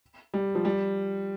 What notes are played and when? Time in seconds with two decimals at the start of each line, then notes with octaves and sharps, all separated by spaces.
0.34 G3
0.55 F3
0.65 G3